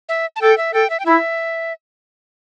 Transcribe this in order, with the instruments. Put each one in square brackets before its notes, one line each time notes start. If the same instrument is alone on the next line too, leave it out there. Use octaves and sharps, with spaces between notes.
[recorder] E5
A5
[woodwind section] A4 [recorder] G5
[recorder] E5
[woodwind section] A4 [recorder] G5
[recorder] E5
G5
[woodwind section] E4 [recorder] E5